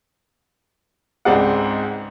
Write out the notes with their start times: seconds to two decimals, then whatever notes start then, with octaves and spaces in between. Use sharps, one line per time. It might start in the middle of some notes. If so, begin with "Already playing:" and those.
1.25 C#2 G#2 C4 G#4 D5 F#5